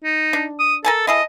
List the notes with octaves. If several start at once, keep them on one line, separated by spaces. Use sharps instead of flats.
D#4
D4
D#6
A4 A#4 G#5 A5
E4 G#4 A4 D#5